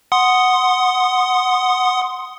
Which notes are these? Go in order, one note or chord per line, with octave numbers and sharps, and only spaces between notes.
F#5 C6 D#6